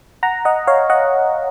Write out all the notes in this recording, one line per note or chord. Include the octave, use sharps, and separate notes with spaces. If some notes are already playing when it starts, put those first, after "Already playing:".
F#5 A#5
D#5 F#5
C#5 F5
D#5 F#5